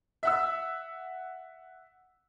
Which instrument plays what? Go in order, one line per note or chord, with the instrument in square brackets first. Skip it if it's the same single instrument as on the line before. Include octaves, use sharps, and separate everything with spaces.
[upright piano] E5 F#5 E6